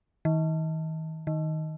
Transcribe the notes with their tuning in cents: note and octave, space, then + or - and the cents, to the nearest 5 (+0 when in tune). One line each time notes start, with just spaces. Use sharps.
D#3 +40
D#3 +10